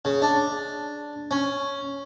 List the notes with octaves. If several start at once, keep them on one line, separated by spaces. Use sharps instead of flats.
C#3
D4
C#4